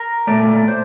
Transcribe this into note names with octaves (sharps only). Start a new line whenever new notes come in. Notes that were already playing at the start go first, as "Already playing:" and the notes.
Already playing: A#4
A#2 F3 A3 D5
C5